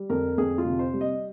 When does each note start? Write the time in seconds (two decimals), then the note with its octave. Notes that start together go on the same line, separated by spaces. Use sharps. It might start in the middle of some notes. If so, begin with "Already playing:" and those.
Already playing: G3
0.09 F2 A#4
0.38 F2 G#4
0.58 F4
0.65 C3
0.79 C5
0.93 G3
1.01 D#5